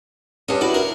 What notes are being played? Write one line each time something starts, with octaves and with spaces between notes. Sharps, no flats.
G2 C#4 D4 D#5
D4 E4 F#4 D5
A#4